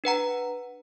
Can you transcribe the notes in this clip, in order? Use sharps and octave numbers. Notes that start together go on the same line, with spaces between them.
D4 B4 F#5 A#5